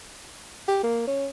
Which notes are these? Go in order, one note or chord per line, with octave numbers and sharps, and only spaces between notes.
G4
A#3
C#4